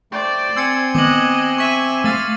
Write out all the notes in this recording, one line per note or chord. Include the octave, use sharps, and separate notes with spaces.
A3 C5 D5 G5
C4 G#5 C6 E6 G#6 C#7
D#3 A3 B3 D#5 D6 F#6 F#7
E5 C#6 B6 D#7
A3 F5 E6 A6